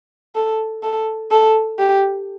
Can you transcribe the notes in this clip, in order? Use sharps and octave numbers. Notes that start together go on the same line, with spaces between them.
A4
A4
A4
G4